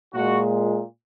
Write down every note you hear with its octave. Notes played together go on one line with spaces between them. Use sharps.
A#2 G#3 F#4